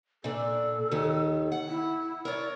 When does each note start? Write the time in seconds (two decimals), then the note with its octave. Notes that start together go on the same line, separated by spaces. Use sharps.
0.24 A#2 D4 A4
0.92 D#2 D#3
1.52 F#5
1.68 E4
2.25 A#4 C#5 D5